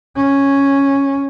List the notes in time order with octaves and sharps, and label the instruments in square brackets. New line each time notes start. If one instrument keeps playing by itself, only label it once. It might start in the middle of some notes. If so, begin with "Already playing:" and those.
[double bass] C#4